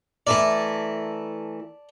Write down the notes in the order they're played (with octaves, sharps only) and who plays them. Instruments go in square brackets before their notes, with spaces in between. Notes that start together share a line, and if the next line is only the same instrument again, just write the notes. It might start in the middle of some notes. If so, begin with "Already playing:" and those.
[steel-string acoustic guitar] E3 A3 A#4 [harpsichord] D5 A5